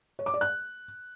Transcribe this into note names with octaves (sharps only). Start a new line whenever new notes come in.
C#5
D6
D5
F#6